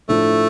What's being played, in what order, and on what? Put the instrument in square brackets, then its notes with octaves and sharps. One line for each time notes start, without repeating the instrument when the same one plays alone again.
[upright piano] A2 F3 D4 A4 [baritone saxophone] A3